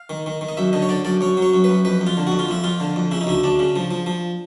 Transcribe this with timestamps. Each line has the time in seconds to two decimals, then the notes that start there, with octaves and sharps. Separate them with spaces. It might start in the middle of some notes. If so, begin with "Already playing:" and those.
Already playing: F5
0.10 D#3
0.26 D#3
0.41 D#3
0.49 D#5
0.57 F#2 E5
0.73 D3 D#5
0.82 C#5
0.89 D3 D5
1.05 F#2 D5
1.21 F#2 C#5
1.37 F#3
1.42 C#5
1.54 F#2
1.64 B4
1.69 F#2
1.85 F2 B4
2.01 F2
2.06 F4
2.17 D3
2.27 F#4
2.32 F2
2.39 F4
2.48 F2 E4
2.64 F2 F4
2.80 D3
2.96 F2
3.11 C#3 E4
3.21 D#4
3.27 D2 E4
3.44 D2 D4
3.59 C#3
3.76 F3
3.91 F3
4.06 F3